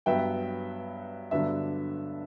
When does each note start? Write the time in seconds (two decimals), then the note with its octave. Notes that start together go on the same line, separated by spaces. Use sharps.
0.06 G2 F#3 B3 E5 G5
1.31 G2 D3 F#3 B3 D4 E5